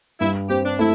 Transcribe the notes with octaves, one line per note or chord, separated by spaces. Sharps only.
G2 E4
C4 G4
D4
A3 E4